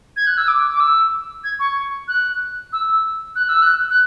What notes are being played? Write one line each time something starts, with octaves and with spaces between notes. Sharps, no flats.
G#6
F#6
E6
D6
D6
E6
G#6
C#6
F#6
E6
F#6
E6
F#6
F#6